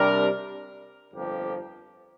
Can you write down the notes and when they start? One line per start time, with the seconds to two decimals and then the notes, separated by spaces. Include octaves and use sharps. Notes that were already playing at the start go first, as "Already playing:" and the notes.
Already playing: C3 G3 D4 A#4
1.12 G1 F2 F3 A#3 G4